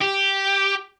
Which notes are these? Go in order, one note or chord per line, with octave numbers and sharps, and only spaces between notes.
G4